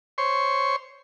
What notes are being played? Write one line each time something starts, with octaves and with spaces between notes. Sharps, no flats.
C5 C#5 C6 C#6